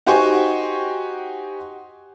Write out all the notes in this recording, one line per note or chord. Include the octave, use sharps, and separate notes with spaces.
D#4 F#4 G4 C5 G#5 C#6